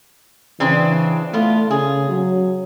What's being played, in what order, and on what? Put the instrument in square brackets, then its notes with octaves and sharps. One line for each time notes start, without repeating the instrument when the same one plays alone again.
[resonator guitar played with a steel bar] C#3 C4 D4 [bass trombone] E3
[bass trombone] A3 [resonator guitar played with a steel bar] B3 F4
[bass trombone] C#3 [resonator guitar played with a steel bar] G#4
[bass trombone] F#3